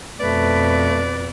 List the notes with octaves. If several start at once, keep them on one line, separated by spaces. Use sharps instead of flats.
F2 B2 A3 B4 D5